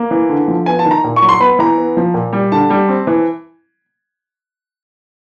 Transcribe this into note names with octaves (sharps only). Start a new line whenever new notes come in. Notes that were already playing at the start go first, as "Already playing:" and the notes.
Already playing: A#3
E3
D3
F3
B3 G#5
A5
D#3
A#5
A#2
C#6
F#3
C6
B3 B5
E3 A#5
B3
F3
A#2
G3
D3 A5
G3
C4
E3